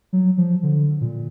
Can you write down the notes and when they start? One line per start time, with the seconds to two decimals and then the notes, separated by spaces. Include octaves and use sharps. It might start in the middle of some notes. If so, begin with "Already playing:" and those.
0.13 F#3
0.37 F3
0.63 D3
1.01 A#2